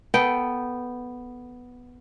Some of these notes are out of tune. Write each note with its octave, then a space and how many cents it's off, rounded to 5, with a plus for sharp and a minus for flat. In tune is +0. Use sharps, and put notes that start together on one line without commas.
B3 +0 A4 +0 G5 -10